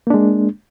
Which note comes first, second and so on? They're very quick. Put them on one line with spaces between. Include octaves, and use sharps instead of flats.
A#3 D4 G#3